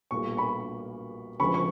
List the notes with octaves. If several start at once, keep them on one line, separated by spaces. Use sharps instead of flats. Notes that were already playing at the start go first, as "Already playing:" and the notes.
B1 A#2 G3 B3 C#6
B5 C#6
D2 C#3 F3 G#3 B3 B5 C#6
C#6